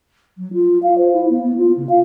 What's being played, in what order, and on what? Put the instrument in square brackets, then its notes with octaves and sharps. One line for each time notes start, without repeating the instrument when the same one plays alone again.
[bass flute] F#3
F4
F5
C5
E4
B3
B3
F4
C#3
F5